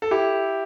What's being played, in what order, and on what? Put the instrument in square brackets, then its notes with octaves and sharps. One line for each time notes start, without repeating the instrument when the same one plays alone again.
[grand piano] A4
E4 G4